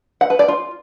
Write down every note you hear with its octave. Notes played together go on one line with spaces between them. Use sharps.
F#5
B4
D5
F4